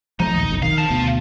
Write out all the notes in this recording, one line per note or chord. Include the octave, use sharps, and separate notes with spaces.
F3 G3 A3 D#4
A#1 D#2
F1 B1 F2
D#3 F5
F5 A5
D2 B2